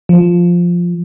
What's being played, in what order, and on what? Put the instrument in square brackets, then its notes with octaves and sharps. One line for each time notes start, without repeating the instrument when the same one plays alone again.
[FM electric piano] F3